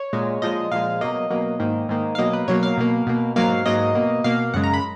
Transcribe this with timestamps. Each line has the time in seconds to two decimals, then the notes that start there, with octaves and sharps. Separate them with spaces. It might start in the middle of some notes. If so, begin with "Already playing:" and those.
Already playing: C#5
0.13 A#2 G#3
0.42 A#2 F3 G#3 D#5
0.71 A#2 F3 G#3 F5
1.01 B2 F#3 A#3 D#5
1.30 B2 F#3 A#3
1.59 G#2 D#3 A#3
1.89 G#2 D#3 A#3
2.15 F5
2.18 B2 F#3 A#3 D#5
2.33 B4
2.48 B2 F#3 A#3 C#5
2.63 F5
2.77 B2 A#3
3.07 B2 A#3
3.36 G#2 F#3 A#3 F5
3.66 G#2 F#3 A#3 D#5
3.95 B2 A#3
4.24 B2 A#3 F5
4.54 F#2 C#3 G#3 F#5
4.63 A#5
4.74 B5